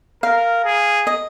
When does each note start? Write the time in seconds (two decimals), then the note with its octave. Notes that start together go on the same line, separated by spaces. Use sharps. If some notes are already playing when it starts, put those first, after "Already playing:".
0.23 A#4 F5
0.65 G#4
1.07 D#5